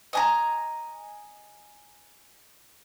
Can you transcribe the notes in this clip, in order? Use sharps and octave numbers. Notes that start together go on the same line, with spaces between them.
D#5 G#5 A#5